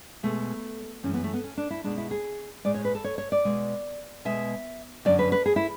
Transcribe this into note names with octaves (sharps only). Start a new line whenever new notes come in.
B2 G#3 A3
F#2 E3 G#3 C#4
B3
A3
B3
C#4
D4
E4
B2 G#3 D4
E4
G#4
A2 G#3 D5
C#5
B4
A4
C#5
C#5
D5
B2 G#3
B2 G#3 E5
F#2 D3 F#3 D5
B4
B4
G#4
E4